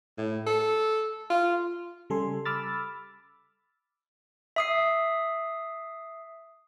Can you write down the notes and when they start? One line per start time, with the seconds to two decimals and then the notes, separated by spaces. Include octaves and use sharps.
0.17 A2
0.47 A4
1.30 F4
2.10 C#3 G3 A4 G#5 C6
2.45 B5 D6 E6 F6 A6
4.56 E5 D#6 C7